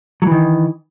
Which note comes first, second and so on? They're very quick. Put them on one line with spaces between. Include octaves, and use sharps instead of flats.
F#3 E3 D#3